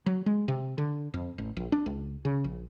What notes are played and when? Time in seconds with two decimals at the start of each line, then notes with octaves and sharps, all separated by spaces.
0.06 F#3
0.26 G#3
0.48 C3
0.78 D3
1.14 F2
1.38 A1
1.57 A#1
1.72 D4
1.86 C#2
2.25 C#3
2.44 A#1